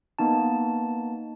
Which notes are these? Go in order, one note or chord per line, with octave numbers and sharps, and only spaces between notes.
A#3 B3 D#4 A5